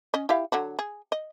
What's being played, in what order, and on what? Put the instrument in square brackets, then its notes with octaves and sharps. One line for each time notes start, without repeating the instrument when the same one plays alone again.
[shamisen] C#4 D#5
E4 G4 F5
D3 F#3 F#4
G#4
D#5